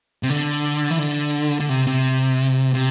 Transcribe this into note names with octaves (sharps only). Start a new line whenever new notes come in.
C3
D3
E3
D3
D3
C3
C3
C3